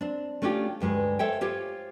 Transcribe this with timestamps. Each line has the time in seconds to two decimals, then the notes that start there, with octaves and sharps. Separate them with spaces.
0.01 C4 D4
0.42 A3 C#4 D4 F4 G4
0.80 D2 G2 G#3 B4
1.19 A4 C5 C#5 E5 F5 G5
1.41 F4 G4 C5 C#5